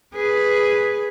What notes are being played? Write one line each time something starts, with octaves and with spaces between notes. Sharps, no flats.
G#4 B4